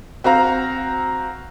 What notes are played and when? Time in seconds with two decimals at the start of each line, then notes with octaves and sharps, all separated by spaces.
0.24 C4 F#4 F5 A#5